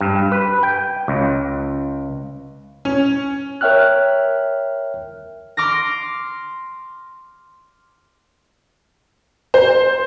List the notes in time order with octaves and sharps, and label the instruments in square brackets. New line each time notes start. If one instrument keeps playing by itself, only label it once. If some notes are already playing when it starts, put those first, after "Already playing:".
[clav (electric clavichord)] G2
B4
G5
C#2
[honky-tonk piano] C#4
[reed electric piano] A#4 C#5 E5 G5 F6 F#6
[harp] C6 D6 F6 A#6
[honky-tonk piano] C5